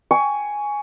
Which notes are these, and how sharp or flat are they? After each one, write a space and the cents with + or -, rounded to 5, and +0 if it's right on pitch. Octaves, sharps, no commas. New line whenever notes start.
G#5 +0 C#6 +20